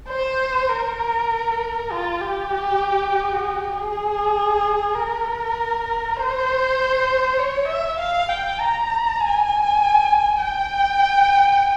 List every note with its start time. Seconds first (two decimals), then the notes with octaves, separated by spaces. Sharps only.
0.09 C5
0.69 A#4
1.92 F4
2.21 G4
3.73 G#4
4.95 A#4
6.17 C5
7.39 C#5
7.68 E5
7.99 F5
8.29 G5
8.60 A#5
9.21 G#5
10.42 G5